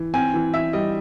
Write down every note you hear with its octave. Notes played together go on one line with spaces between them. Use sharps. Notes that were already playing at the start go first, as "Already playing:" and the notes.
Already playing: E3
C4 G#5
E3
E3 E5
G3 D#5